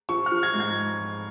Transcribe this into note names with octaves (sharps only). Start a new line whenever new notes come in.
F3 C#6
F6
F3
G#6
G#2
G#6